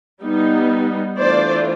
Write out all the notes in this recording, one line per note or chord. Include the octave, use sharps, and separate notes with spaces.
G3 B3 D#4
E3 A3 D4 F4 C5 D5